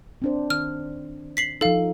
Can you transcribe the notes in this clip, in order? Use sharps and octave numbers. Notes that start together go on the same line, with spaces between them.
C4 D4 C5
D#3 F6
B6 C7 F#7
F3 D#4 A4 F5